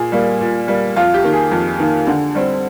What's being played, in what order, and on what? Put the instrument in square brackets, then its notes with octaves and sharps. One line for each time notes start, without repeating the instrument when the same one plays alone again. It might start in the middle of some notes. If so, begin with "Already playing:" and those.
Already playing: [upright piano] A#2 G#4
G3 A#3
A#2
G3 A#3
F2 F4
G4
D#3 A#3
G#4
F2
D#3 A#3
D3
G3 C4